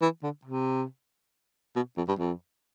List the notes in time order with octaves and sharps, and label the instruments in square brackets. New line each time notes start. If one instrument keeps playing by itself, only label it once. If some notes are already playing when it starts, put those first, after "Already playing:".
[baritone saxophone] E3
D3
C3
B2
F2
G2
F2